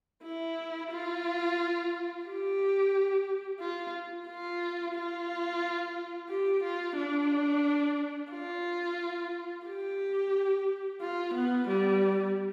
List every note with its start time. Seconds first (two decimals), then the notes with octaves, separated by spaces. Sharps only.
0.23 E4
0.91 F4
2.25 G4
3.60 F4
4.27 F4
4.95 F4
6.29 G4
6.63 F4
6.97 D4
8.32 F4
9.66 G4
11.01 F4
11.34 B3
11.68 G3